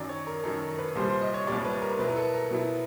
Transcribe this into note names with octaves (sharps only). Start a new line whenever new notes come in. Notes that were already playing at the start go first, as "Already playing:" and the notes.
Already playing: F#2 D#3 F#3 D5
C#5
A#4
F#2 D#3 F#3 A4
A#4
B4
C2 A#2 G3 C5
C5
D#5
C#5
C2 A#2 G3 D5
B4
A#4
B2 F#3 B3 E4 B4
A#4
A4
A#4
B2 F#3 B3 E4